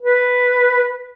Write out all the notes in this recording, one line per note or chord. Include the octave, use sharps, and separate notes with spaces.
B4